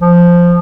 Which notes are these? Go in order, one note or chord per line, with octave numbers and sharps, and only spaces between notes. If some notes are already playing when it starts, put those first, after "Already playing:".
F3